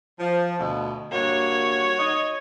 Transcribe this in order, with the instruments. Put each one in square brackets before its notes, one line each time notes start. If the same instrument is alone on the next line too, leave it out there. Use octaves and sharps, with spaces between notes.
[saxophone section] F3
D2 B2
[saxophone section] G2 A#3 F#4 [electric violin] C#5
[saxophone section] D#4 D#5